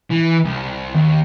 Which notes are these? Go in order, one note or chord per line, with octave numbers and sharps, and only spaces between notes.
E3
C2
D#2